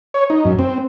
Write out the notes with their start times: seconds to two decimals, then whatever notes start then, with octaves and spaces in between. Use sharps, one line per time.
0.14 C#5
0.30 D#4
0.45 F#2
0.59 C4